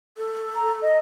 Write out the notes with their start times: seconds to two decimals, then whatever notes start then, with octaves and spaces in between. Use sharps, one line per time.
0.17 A4
0.55 A#5
0.82 D#5